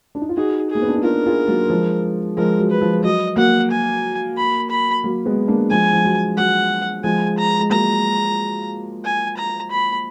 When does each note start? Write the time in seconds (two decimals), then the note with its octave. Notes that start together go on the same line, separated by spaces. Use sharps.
0.15 D4
0.22 D#4
0.29 F4
0.36 D#4 F#4 G#4
0.70 G#4
0.75 A#3
0.82 B3
0.88 D4
0.96 D#4
1.03 D4 F4 A#4
1.26 F4 G#4
1.48 F#3 A#3
1.70 F3 G#3
2.37 F3 G#3 A#4
2.59 F#3
2.70 B4
2.81 F3
3.03 F#3 D#5
3.36 F#3 A#3 F#5
3.71 G#5
4.37 B5
4.70 B5
5.04 F#3 A#3
5.26 G#3 B3
5.48 A#3 D4
5.70 F3 G#3 G#5
5.93 F3
6.04 F#3
6.37 F#3 F#5
7.03 F3 G#3 G#5
7.38 A#5
7.61 G#3
7.70 F#3 A#3 A#5
9.04 G#5
9.37 A#5
9.71 B5